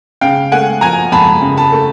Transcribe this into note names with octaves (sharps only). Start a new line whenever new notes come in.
C#3 F5 G5
A3 F#5 G#5
F3 G#5 A#5
F2 A5 B5
C#3
A5 B5
A3